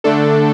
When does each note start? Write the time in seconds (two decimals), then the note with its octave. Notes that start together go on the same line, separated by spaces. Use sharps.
0.04 D3 A3 D4 A4